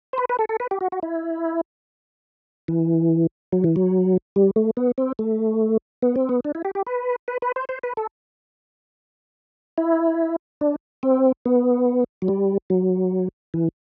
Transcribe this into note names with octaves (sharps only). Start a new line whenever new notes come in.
C5
B4
B4
A4
A4
B4
G4
F#4
F#4
E4
E3
F#3
E3
F#3
G3
A3
B3
C4
A3
B3
C4
B3
D4
E4
G4
G4
B4
B4
B4
C5
C5
B4
A4
E4
D4
C4
B3
F#3
G3
F#3
E3